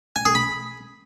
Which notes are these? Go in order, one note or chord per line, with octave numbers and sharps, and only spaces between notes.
G#5
G#4
B5